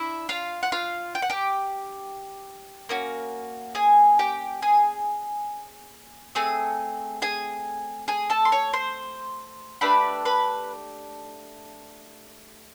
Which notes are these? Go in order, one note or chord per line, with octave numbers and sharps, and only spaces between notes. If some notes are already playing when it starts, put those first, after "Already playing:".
Already playing: D4 E4 E5
F4 F5
F#5
F4 F5
G5
F#5
G4 G5
A#3 C#4 F#4
G#4 G#5
G4 G5
G#4 G#5
A3 C4 G#4 G#5
G#4 G#5
G#4 G#5
A4 A5
C6
C#5 C#6
C5 C6
A3 D4 G4 B4 B5
B4 B5